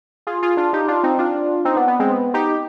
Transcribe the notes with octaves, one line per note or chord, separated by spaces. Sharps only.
F4 G#4
F4 G#4
D4 F4
D#4 G4
D4 F4
C4 D#4
D4 F4
C4 D#4
B3 D4
B3
G#3 C4
B3
D#4 G4